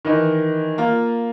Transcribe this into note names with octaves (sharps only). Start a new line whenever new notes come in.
D#3 E3 D#5
A#3 F4